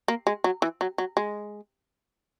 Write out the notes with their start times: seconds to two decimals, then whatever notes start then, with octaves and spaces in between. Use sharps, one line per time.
0.08 A#3
0.27 G#3
0.44 F#3
0.62 E3
0.81 F#3
0.98 F#3
1.17 G#3